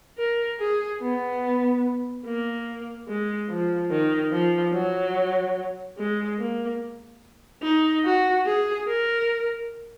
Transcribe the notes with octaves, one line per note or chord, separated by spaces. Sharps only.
A#4
G#4
B3
A#3
G#3
F3
D#3
F3
F#3
G#3
A#3
D#4
F#4
G#4
A#4